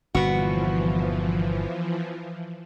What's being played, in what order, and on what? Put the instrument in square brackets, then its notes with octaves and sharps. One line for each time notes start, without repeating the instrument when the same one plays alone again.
[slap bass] G1 A#2 [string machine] E3 F3 [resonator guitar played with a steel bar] B3 F#4